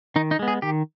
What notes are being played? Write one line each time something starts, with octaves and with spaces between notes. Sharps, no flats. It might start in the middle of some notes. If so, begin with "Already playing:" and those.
D#3 D#4
D#4
G#3 B3
G#4
D#3 G4